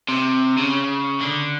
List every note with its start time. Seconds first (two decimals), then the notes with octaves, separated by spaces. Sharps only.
0.08 C3
0.57 C#3
1.20 D3